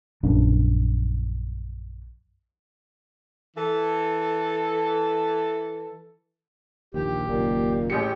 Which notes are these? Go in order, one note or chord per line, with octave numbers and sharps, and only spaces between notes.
A#1 F#2 C#4 D4
E3 A4
A#1 D#2 G4
F#1 D#2 A#2
A1 G4 G#4 C#7